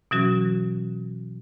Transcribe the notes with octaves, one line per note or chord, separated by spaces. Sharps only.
B2 E3 F#3 C#4 F#4